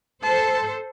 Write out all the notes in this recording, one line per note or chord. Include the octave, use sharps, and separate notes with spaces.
A4 C5 A5